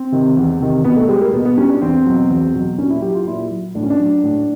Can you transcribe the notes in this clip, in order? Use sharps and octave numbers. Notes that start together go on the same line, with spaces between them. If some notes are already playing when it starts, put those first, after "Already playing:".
Already playing: C4
C3 D#3
E2
C3 D#3
B2 B3
A3
G3 G#3
A#3
B2 B3
B3
G3 C#4
D4
E2 C4
B2 F#3
E2
B2 F#3
A#2 C#4
E4
F#3 G4
F4
A#2 E4
F#3
A2 D4
C#4
D4
F#3
A2